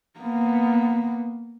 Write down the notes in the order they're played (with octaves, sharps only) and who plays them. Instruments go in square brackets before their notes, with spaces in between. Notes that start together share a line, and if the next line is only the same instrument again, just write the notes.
[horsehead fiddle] A#3 B3